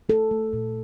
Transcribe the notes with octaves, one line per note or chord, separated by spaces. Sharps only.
A3 A4
A3
A#2